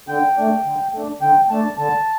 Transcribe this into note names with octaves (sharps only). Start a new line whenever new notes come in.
D3 G5
A3 D4
D3
A3 D4
D3 G5
A3 D4 A5
D3 A5